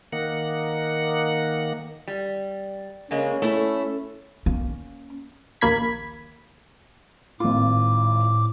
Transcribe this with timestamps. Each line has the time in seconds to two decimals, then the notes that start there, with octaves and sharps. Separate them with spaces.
0.13 D#3 A#3 F#5
2.08 G3
3.11 C#3 G#3 A#3 C#4
3.42 A3 E4 A4
4.46 A#3 C#4
5.61 A#1 D#2 A#3 B5 G#6 B6
7.40 G#1 A2 F4 D6